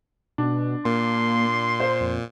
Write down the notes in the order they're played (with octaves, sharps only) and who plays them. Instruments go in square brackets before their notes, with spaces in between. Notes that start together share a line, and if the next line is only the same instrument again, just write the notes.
[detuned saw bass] B2 [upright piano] D4
[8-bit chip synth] A#2 [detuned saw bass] A#3 [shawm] C6
[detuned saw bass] A#3 [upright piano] C5
[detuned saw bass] F2